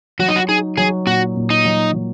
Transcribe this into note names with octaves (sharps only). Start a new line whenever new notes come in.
F#3 F#4
D#4
F#4
D#4 G#4
F#3 G#4
A#2 F#4
A#2
D#4
F#3
F#3